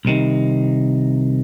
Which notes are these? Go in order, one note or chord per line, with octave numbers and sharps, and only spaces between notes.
C2 C3 D#3